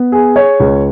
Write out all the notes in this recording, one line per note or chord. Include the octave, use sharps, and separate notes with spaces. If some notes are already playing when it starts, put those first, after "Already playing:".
Already playing: B3
G#4
C#5
C#2